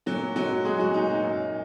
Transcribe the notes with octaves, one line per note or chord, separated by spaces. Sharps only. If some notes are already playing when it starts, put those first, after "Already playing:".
A#2 F#3 F#4
F#3 G#3 F#4
G#3 G#4
F#3 F#4
A#2 D#4
D#4
F#2